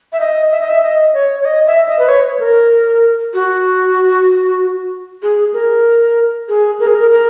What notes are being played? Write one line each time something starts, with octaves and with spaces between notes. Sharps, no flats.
E5
D#5
E5
D#5
E5
D#5
C#5
C#5
D#5
E5
D#5
B4
C#5
A#4
F#4
G#4
A#4
G#4
A#4
G#4
A#4
A#4